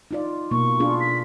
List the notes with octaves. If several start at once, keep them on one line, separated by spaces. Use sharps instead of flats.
D#4 F4 D5
B2 A#3 C#6
D4 F4 G#4
B6